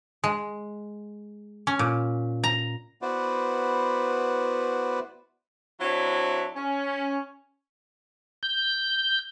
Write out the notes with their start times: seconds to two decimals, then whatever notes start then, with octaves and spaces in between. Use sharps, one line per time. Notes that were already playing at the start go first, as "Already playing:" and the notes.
0.24 G#3
1.67 C#4
1.79 A#2
2.44 A#5
3.02 B3 E4 F#4 B4 C5 D5
5.81 F#3 C4 D4 E4
6.55 C#4
8.43 G6